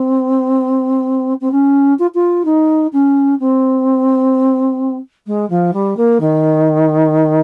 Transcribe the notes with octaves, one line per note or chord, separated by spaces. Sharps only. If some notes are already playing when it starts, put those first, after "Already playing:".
Already playing: C4
C4
C#4
F4
F4
D#4
C#4
C4
G#3
F3
G3
A#3
D#3